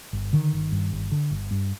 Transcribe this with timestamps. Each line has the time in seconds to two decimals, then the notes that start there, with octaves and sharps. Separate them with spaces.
0.13 G1
0.33 D3 D#3
0.53 G1
0.72 G2
0.92 G1
1.12 D3
1.31 G1
1.51 G2